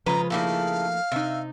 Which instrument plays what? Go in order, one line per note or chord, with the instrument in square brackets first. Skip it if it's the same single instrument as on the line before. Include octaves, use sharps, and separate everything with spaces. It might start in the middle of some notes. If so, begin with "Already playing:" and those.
[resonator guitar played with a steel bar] C#3 B4 [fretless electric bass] F3 [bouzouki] G#3 F4 [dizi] A#5
[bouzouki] C#3 E4 A4 [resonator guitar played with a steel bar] A3 A#3 D#4 [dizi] F5
[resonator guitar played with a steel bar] C3 D#4 [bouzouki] E5